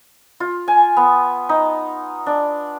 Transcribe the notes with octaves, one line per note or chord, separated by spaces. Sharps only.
F4
G#5
B3
D#4
D4